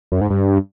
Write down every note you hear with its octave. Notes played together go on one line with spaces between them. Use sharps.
F#2
G#2
G2